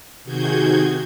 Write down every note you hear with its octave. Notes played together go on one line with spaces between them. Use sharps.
C3 D#3 F#4 G#4 G6 G#6